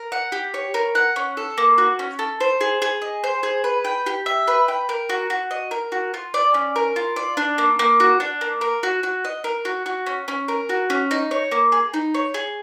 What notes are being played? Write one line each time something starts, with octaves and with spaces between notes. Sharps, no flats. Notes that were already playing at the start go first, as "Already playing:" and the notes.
Already playing: A#4
F#5
G4
C#5
A#4
F#5
C#4
A4
A#3
F#4
C#4
A4
C5
G#4
G#4
D#5
C5
G#4
B4
G5
G4
E5
B4
G5
A#4
F#4
F#4
D#5
A#4
F#4
F4
D5
C#4
A#4
F4
D5
D4
A#3
A#3
F#4
D4
A#3
A#4
F#4
F#4
D#5
A#4
F#4
F#4
C#4
C#4
A#4
F#4
C#4
D#4
C#5
A#3
G#4
D#4
C#5
G#4